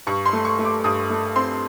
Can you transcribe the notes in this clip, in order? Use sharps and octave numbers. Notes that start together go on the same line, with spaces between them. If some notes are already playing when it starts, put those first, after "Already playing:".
G2 C#6
C6
A3
C#6
A3
D6
G2 D#6
A3
C4 C6